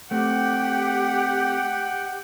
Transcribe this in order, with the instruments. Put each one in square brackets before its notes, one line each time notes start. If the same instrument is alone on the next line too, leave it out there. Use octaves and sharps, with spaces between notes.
[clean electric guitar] A3 C4 [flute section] G4 [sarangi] F#5 [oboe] G5